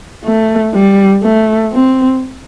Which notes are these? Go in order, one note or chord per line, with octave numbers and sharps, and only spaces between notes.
A3
G3
A3
C4